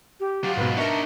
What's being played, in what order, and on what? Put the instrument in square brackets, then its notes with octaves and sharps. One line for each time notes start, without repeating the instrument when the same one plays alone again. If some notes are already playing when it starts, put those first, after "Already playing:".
[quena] G4
[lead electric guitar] F#3 F4
[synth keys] G#2 B2 [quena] B4
[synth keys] D4 A#4 [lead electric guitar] D#4 C#5 [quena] E5